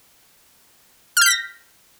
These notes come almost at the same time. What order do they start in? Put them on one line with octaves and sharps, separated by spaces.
F6 G6 B6 A#6